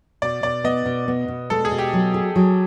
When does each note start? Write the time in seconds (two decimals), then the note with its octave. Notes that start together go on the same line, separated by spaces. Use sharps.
0.22 B2 D5
0.43 B2 D5
0.64 B3 D#5
0.86 B2
1.08 B3
1.28 B2
1.50 G#3 A4
1.65 G#4
1.71 B2
1.78 G4
1.93 F#3
2.14 G#4
2.36 F#3